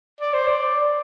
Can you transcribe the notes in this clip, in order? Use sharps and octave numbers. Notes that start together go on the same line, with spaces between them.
D5
C5
D5